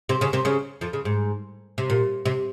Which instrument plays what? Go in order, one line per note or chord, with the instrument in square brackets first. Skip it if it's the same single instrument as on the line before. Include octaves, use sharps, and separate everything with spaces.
[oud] C3 C4
C#3 C#4
C3 C4
C#3 C#4
F2 F3
C#3
G#2
C3
A#2
C3